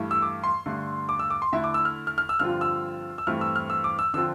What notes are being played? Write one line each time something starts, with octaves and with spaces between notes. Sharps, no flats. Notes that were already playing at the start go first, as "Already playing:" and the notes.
Already playing: G2 E3 A3 E4
E6
D6
C6
G2 D3 A3
D6
E6
D6
C6
D3 A3 E4 E5
D6
E6
F6
F6
F6
E6
G2 D3 F3 C4 F4 F6
E6
E6
G2 E3 A3 C4 E4 F6
E6
F6
E6
D6
E6
D3 F3 C4 F4 E6